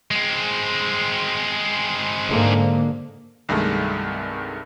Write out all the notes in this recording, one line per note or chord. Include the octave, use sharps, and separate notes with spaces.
G#3 C4
G#2 D3 A#3
C2 G2 D#3 G#3 A3